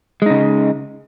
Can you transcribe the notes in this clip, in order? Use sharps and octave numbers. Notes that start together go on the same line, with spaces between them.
C#3 G#3 D#4